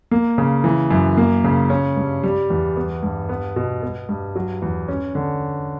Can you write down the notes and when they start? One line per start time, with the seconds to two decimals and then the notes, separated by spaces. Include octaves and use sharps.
0.11 A#3
0.38 C#3
0.64 E3
0.91 F#2
1.17 A#3
1.44 C#3
1.70 C#4
1.96 G2
2.23 G3
2.50 E2
2.77 B3
3.03 G2
3.29 B3
3.56 B2
3.83 B3
4.09 G2
4.36 F#3
4.62 E2
4.88 C#4
5.15 D3